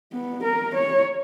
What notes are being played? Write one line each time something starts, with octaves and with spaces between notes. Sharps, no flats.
B3
A#4
C#5